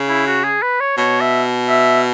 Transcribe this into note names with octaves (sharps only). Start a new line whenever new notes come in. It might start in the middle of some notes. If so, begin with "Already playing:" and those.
Already playing: C#3
E4
F#4
G#4
B4
C#5
B2 C#5
E5
E5